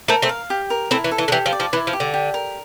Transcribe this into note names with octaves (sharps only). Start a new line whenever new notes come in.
A3 C4 A#4
A3 C4
F5
G4
A#4
A3 C4 E4
E3
A4
E3
D3
E3 G4
F3
D5
F3
E3 E4
F3
G4
D3
G4
A#4